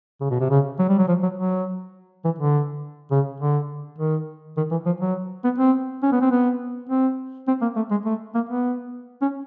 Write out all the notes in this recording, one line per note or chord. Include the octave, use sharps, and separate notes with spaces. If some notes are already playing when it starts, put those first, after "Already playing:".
C#3
B2
C3
C#3
F#3
G3
F#3
F3
F#3
F#3
E3
D3
C#3
D3
D#3
D#3
E3
F3
F#3
B3
C4
C#4
B3
C4
B3
C4
C4
A#3
A3
G#3
A3
A#3
B3
C#4